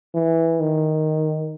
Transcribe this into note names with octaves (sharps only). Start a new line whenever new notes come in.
E3
D#3